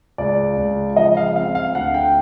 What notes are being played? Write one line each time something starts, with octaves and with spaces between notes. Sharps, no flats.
C#2 D5
C#2
F3 D#5
F5
C4 F5
F5
D2 F#5
G5